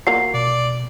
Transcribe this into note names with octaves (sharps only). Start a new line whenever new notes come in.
A#3 F4 F#4 C7
B2 D5